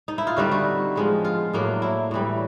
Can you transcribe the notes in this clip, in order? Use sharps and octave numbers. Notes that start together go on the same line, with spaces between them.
D#4
E4
F4
D3 G3 C4 D#4 F#4
F#4
F3 G#3 B3
F4
A2 F#3 A#3 D4
E4
A2 E3 G3